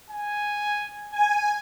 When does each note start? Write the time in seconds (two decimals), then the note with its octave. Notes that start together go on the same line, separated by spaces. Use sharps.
0.10 G#5
1.11 G#5